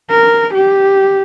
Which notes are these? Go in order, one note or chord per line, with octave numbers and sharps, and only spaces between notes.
A#4
G4